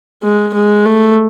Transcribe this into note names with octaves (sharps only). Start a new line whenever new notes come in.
G#3
G#3
A3